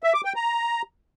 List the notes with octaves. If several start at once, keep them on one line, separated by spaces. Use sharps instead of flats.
E5
D6
G5
A#5